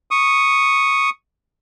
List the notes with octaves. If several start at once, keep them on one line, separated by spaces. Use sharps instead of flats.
C#6 D#6